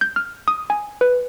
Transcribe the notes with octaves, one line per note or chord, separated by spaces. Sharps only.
G6
F6
D#6
G#5
B4